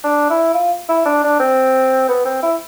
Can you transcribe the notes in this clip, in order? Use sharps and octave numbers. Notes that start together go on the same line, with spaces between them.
D4
E4
F4
E4
D4
D4
C4
B3
C4
E4